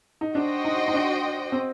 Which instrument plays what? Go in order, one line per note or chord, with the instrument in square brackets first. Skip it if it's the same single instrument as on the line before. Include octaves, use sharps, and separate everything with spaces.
[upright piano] D#4
[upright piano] D4 [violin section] F#4 C5 D#5 G5
[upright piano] D#4
D#4
D4
C4